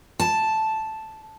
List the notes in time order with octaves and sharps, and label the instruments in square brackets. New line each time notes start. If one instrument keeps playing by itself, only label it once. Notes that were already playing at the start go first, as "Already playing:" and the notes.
[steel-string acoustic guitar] A5